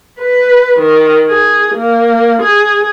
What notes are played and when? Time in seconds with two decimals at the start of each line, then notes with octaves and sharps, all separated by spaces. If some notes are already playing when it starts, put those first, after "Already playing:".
0.20 B4
0.79 D#3
1.28 G#4
1.75 A#3
2.42 G#4